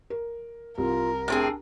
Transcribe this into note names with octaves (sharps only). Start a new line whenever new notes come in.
A#4
C2 F4 A#4
A2 C4 D4 G#4